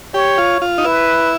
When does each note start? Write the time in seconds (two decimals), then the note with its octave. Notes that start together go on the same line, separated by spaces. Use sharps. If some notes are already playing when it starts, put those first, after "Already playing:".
0.14 G4 C#5
0.38 F4
0.62 F4
0.78 D#4
0.85 E4 B4